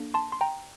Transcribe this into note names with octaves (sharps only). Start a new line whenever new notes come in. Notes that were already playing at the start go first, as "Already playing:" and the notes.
Already playing: A#3 D4 A4
A5 C6
C6
G5 A#5